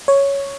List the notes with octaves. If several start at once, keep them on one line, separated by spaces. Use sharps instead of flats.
C#5